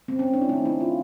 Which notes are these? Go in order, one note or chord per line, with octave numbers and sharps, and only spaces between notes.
C4
C#4
D4
E4
D#3 F#3 A3 D#4
E4
F4